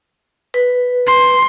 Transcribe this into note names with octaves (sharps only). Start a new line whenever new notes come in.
B4
C6